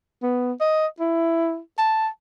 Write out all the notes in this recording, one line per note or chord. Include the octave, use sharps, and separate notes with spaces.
B3
D#5
E4
A5